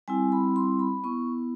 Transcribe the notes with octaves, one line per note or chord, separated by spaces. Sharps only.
G3 C4 E4 G#5
B5
C6
B5
B3 E4 C#6